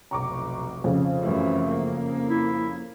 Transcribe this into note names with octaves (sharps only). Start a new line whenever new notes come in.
F1 B1 A#5 C#6 D6
F2 C#3
F#2 E3 A3
A#3
E4